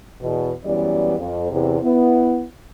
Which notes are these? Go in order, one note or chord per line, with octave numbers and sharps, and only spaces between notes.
E2 B2
F#2 E3 G3 B3 D5
F2
E2 C3
B3 E4